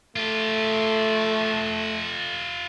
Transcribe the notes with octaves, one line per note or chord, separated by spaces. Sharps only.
A3 F4 G4